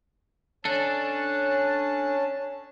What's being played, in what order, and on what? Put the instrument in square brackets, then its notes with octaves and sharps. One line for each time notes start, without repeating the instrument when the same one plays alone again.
[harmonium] C#4 A5 [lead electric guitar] D4 A4